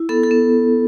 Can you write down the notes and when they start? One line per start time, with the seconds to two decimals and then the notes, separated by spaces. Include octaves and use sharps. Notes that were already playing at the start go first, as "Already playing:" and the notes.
Already playing: E4
0.09 B3 A4
0.23 A4
0.31 B3